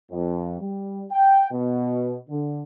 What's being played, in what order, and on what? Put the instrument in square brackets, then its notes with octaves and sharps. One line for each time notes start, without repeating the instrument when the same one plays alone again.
[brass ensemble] F2
G3
G5
B2
D3